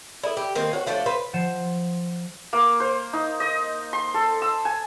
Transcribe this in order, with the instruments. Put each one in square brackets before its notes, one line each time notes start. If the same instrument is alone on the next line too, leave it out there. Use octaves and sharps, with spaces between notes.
[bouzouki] E4 [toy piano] A4 D5
[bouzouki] G4
D#3 A#3 C4
[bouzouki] F#4 [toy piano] C5 C#5 F#5
[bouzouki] F3 A3 D4 [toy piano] C#5 F5
[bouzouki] B4 C5
[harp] F3 C5 F#5 D#7 E7
[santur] A#3
C5
D#4
D#5
C6
A4
E6
G#5